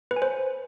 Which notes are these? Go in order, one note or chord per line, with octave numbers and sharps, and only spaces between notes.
B4
G#5
C5